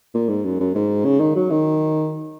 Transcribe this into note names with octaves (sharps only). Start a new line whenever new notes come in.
A#2
G#2
F#2
F#2
G#2
C#3
D#3
F#3
D#3